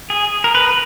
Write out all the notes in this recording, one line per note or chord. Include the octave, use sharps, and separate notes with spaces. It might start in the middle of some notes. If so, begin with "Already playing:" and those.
G#4
A#4
B4